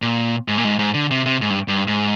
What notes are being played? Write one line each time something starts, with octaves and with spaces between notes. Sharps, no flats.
A#2
G#2
A#2
G#2
G#2
D3
C3
C3
G#2
G2
G2
G#2